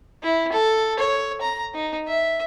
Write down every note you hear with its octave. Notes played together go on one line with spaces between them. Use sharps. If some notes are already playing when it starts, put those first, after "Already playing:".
E4
A4
C#5
A#5
D#4
E5